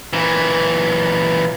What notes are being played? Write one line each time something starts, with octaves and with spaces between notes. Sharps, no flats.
A#2 E3